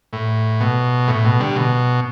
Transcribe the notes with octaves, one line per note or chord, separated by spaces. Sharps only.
A2
B2
A2
B2
D3 G3
B2